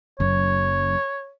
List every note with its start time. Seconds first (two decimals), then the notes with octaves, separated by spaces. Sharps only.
0.20 F#1 F#2 C#5